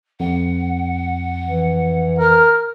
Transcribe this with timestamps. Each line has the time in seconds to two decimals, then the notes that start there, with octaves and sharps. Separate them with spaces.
0.20 F2 F#5
1.45 E3
2.19 A#4 F6